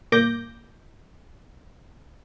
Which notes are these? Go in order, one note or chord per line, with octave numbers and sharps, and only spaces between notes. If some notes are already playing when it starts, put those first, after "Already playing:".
G1 A#2 A#3 D6 G6 A#6